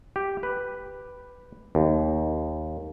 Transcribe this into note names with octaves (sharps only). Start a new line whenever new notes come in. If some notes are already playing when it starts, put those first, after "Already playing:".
G4
B4
D#2